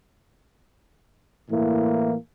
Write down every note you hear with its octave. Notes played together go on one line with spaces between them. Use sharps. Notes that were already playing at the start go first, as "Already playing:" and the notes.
A2 E3 A#3 E4